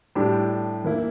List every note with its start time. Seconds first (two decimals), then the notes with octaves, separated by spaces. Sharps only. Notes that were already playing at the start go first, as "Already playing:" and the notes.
0.15 A2 G3 D4 G4
0.84 E3 A#3 E4